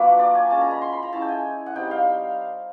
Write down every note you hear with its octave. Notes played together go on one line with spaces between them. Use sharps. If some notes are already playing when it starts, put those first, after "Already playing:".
Already playing: F#3 A#3 D4 F4 B4
D5
G#5
G#3 C#4 F4 A5
A#5
B5
C6
B5
A#5
G#3 C#4 E4 A5
G5
G#5
F#5
G3 C4 D#4 G5
F5